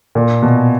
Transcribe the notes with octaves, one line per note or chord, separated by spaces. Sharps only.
A#2
B2